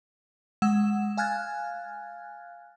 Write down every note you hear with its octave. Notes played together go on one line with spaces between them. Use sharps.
G#3 F#5 E6 E7
F5 G#5 F6 F#6 G#6 A6